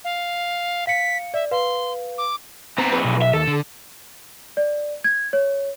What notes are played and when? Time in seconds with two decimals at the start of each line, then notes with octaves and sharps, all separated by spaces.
0.05 F5
0.87 F5 B6 C#7
1.34 D5 E5
1.51 B4 F5 C6
2.18 D6
2.78 B2 B3 C4 A#5
2.93 F2 B4
3.05 B1
3.22 E5
3.33 D#2 A4
3.48 D3
4.57 D5
5.04 G#6
5.33 C#5